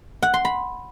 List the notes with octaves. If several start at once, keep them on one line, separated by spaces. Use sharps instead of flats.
F#5
C6
B5